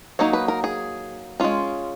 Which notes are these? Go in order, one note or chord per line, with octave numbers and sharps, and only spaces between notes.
F#3 A#3 D#4 C#5
B4
A#4
G#4
G#3 C#4 F4